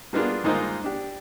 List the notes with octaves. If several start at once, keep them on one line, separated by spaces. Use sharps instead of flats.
G3 A#3 B3 D4 F4 G#4
G2 G#3 A#3 D#4 F4 C5
D4 G4